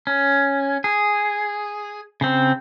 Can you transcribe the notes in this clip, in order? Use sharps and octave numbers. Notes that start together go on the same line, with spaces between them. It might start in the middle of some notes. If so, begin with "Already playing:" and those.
C#4
G#4
C#3 C4